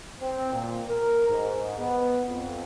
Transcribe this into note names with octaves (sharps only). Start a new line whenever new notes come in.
C4
A#2
A#4
G#2
B3
F2